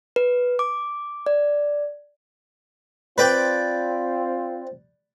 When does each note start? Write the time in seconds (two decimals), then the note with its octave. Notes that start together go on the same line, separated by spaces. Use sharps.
0.16 B4
0.59 D6
1.26 D5
3.18 C4 F4 B4 D5 G5